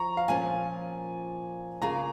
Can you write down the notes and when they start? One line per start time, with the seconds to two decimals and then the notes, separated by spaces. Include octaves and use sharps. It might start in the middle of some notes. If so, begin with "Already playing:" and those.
Already playing: F3 A#5 C#6
0.17 F5
0.28 A#2 F3 A#3 C#4 G#5
1.82 C#3 A#3 F4 G#4 A#5